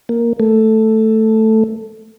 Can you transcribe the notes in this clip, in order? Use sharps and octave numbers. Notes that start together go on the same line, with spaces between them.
A#3
A3